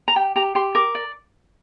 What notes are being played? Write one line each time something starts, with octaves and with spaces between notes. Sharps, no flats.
A#5
G4 G5
G4 A#5
G4 C6
A#4 D6
D5